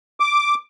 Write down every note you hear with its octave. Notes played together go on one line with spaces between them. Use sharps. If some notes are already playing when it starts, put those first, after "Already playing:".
D6